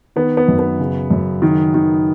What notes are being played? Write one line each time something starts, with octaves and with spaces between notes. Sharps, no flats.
D#3 B3
B3
F#2
B3
C#3
F#2
D#3
D#3